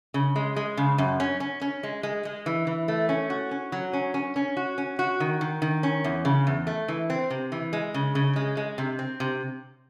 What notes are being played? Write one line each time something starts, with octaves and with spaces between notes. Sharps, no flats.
C#3
G#3
G#3
C#3
F#2
C#4
C#4
C#4
G#3
G#3
G#3
E3
E3
A3
C#4
F#4
C#4
F#3
C#4
C#4
C#4
F#4
C#4
F#4
D#3
D#3
D#3
C#4
E2
C#3
E2
A3
E3
C4
C3
E3
G#3
C#3
C#3
G#3
G#3
C3
C4
C3